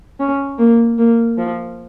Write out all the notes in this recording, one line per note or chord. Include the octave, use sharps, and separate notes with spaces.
C#4
A#3
A#3
F3